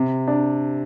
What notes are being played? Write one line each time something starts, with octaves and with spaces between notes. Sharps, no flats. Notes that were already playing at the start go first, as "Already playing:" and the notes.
Already playing: C3
D4